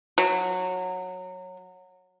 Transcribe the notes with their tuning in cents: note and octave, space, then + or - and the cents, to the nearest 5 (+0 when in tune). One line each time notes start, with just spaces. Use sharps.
F#3 -15